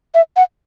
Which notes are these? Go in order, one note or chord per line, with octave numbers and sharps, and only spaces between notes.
E5
F#5